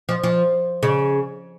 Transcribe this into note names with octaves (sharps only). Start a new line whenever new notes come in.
F3
F3
C#3